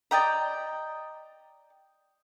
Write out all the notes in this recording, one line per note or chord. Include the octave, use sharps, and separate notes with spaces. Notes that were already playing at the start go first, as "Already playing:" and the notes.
D5 D#5 G5 A#5